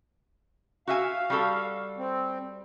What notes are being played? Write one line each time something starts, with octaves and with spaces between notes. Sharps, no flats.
F#4 E5 F5 G#5
G3 F#4 A4
C4